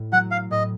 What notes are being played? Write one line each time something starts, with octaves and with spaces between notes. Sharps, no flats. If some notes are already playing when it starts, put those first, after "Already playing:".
Already playing: A2
F#3 F#5
F5
A2 D#5